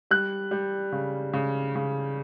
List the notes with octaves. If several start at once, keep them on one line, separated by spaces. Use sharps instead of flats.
G3 F#6
G3
C#3
C#3
C#3